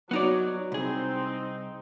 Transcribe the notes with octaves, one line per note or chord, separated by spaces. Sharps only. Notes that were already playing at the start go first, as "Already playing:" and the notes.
F#3 B3 D#4 D5
C2 C4 D#4 G#4